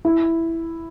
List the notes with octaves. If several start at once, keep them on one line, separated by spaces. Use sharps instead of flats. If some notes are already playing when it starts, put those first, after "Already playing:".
E4